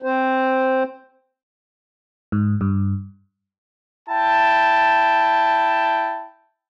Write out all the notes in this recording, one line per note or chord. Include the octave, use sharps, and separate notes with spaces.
C4 C5
G#2
G2
E4 G5 A5